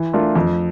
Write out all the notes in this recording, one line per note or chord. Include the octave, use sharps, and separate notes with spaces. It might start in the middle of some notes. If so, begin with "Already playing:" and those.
Already playing: E3
A3 D4 F4 A#4
F2